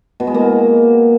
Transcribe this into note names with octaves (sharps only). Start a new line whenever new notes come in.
B2
G#3
A#3